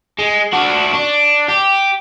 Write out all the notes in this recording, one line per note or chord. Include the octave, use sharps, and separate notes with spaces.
G#3
D4 F#4
D4
G4